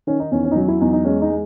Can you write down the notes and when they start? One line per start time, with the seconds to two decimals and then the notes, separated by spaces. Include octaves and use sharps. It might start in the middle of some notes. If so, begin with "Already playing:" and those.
0.07 D#3 C#4
0.20 D#4
0.31 E2 C#4
0.44 C#4
0.51 D#4
0.56 F#3 C#4
0.68 E4
0.81 E2 D#4
0.93 D#4
1.05 G#3 C#4
1.22 D#4
1.30 G#3